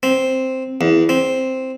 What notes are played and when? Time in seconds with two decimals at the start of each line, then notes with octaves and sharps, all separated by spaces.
0.03 C4
0.81 E2
1.09 C4